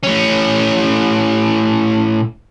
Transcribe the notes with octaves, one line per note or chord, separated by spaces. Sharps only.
A2 C#4